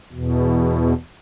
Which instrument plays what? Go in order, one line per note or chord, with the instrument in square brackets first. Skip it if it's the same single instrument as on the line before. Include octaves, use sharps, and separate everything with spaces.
[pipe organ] E2 B2